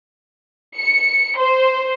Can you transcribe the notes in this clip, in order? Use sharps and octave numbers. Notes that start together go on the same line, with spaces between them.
C#7
C5